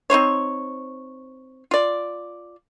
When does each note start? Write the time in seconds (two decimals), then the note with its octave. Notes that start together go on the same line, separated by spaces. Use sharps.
0.10 C4 D#4 C5 C#5
1.71 F4 D5